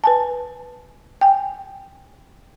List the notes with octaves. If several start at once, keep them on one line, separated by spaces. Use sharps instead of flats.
B4 G#5 A5
G5 G#5